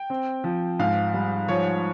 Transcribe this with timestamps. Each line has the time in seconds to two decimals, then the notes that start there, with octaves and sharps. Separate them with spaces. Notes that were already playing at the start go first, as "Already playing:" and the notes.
Already playing: G5
0.10 C4
0.44 F3
0.79 G#2 F5
1.14 G3
1.48 F3 C#5